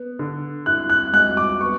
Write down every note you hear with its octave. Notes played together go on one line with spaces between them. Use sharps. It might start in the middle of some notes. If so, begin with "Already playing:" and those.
Already playing: B3
D3
E4 F#6
F#6
G#3 F#6
D6
B3 C#6